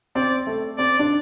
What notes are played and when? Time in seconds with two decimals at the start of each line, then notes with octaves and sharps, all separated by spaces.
0.15 C4 D5
0.47 A3
0.78 C4 D5
0.99 D4